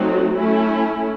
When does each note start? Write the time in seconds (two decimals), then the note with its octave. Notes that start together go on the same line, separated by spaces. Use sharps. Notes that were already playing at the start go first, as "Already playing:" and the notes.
Already playing: F#3 A3 C4 D#4 F#4
0.39 A3 C#4 E4